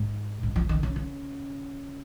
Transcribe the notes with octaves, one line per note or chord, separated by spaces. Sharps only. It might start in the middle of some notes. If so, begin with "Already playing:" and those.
Already playing: G#2
G#2
F3
D#3
C#3
C#3